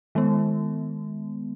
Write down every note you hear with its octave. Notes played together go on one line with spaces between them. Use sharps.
D#3 G#3 B3